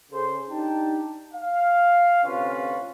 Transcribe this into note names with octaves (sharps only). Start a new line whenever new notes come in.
C#3 G#4 A4 C5
D4 D#4 G4 G5 A5
F5
D2 C3 C#4 F4 B4 F5